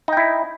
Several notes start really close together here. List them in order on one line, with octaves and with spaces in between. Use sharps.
D#4 G5 E4